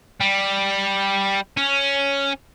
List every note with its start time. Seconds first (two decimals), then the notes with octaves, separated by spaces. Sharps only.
0.20 G3
1.57 C#4